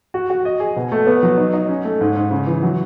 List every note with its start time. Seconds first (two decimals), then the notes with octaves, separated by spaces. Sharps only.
0.14 F#4
0.30 F#4
0.45 D#5
0.60 G#4
0.76 B2
0.92 A3
1.07 B3
1.23 F#3
1.38 D#4
1.53 D#4
1.69 C#4
1.85 A3
2.01 G#2
2.16 G#2
2.31 C#3
2.47 E3
2.62 F#3